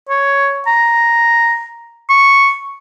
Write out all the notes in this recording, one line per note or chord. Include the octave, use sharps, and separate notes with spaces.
C#5
A#5
C#6